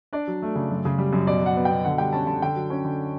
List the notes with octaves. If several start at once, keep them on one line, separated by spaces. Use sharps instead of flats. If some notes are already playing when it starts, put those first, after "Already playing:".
D4 D5
F#3
A3
C#3
F#2
C#3
G3
F#2
B2 D5
F#3 F#5
B3
G5
B2
D3 F#5
G3 G5
C#4 A5
D3 A5
D3 G5
F#3
C#4
D3